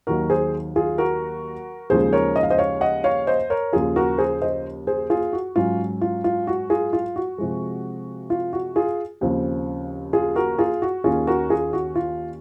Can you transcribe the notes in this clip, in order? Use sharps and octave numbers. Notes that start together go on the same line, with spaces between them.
D#2 D#3 F#3 F#4 A#4
G#4 C5
F4 G#4
F#4 A#4
D#2 C#3 F3 G#3 D#4 G#4 C5
A#4 C#5
D#5
F5
C5 D#5
C#5 F5
D#5 F#5
C#5 F5
C5 D#5
A#4 C#5
D#2 C#3 F3 F4 G#4
F#4 A#4
G#4 C5
C5 D#5
G#4 C5
F4 G#4
F#4
G#2 F#3 C#4 F4
F4
F4
F#4
F4 G#4
F4
F#4
C3 F3 G#3
F4
F#4
F4 G#4
D#2 C#3 F3 C4
F4 G#4
F#4 A#4
F4 G#4
F#4
D#2 D#3 A#3 C#4 F4 G#4
F#4 A#4
F4 G#4
F#4
F4